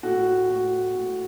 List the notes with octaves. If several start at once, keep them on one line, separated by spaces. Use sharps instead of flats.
A2 F#4
A2 F#4
A2